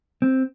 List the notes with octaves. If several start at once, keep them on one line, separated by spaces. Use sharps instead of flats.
C4